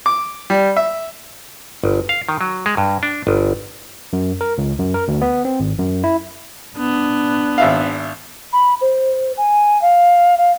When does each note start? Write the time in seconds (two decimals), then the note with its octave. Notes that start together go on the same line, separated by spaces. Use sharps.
0.06 D6
0.50 G3
0.77 E5
1.84 G1
2.09 F5
2.29 D#3
2.41 F#3
2.66 G#3
2.77 G2
3.03 D4
3.27 G1
4.13 F#2
4.41 A#4
4.58 C#2
4.79 F#2
4.94 A#4
5.08 D2
5.22 B3
5.45 C4
5.60 G#1
5.78 F#2
6.04 E4
6.77 B3 D4
7.58 G#1 E5 F5
8.53 B5
8.81 C5
9.37 G#5
9.82 F5
10.38 F5